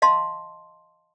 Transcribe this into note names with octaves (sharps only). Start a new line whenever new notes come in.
D#5 F5 A5 C6